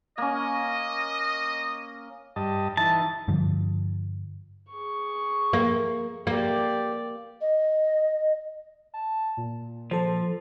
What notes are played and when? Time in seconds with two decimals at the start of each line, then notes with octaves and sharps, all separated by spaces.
0.18 A#3 C#4 D#5
2.36 G2 D#5 A5
2.77 E3 D#4 A5
3.28 G2 D3 F3
4.71 G#4 C#6
5.53 A#3
6.27 A#3 G4 D5
7.41 D#5
8.94 A5
9.37 A#2
9.91 F3 A4 C5